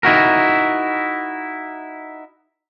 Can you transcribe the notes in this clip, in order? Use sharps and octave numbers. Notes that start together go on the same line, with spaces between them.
D#4 E4 F#4 A#4